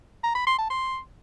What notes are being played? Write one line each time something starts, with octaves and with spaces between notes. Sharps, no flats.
A#5
B5
C6
A5
C6